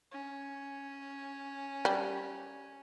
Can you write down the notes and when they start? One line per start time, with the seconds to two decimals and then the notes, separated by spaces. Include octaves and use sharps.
0.12 C#4
1.85 G3